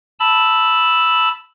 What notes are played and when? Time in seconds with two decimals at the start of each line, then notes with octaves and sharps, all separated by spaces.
0.20 A5 B5 E6